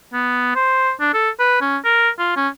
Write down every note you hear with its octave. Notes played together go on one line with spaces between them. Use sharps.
B3
C5
D4
A4
B4
C#4
A#4
F4
C#4